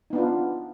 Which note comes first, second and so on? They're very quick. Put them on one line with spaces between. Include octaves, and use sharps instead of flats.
D#4 B3 D4 F4